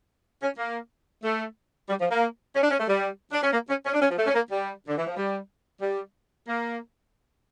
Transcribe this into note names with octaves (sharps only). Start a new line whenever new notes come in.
C#4
A#3
A3
G3
F3
A#3
C#4
D4
C#4
A3
G3
D4
C#4
A#3
C#4
C#4
D4
C#4
F3
A3
C#4
A#3
G3
D3
E3
F3
G3
G3
A#3